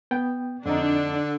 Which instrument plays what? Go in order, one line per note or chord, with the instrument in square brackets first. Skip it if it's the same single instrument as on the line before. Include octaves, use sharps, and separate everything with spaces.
[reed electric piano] B3 G5
[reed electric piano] F2 D#4 [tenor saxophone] D3 [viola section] D4